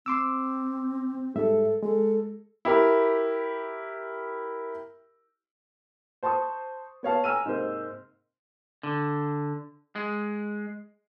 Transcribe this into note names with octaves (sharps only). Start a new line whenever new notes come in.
C4 C6 D6 E6
G#2 G3 A4 E5
G#3 A4
E4 G4 A#4
C5 A5 C6 C#6 D#6
B3 C#5 F5 A5
G#5 A#5 E6 F6 D#7
G#2 C3 A#3 C5
D3
G#3